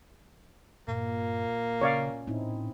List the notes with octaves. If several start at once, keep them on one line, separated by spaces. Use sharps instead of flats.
G2 A#2 A#3
C#3 C#4 C#5 D5 F5
A2 C4 D#4 E4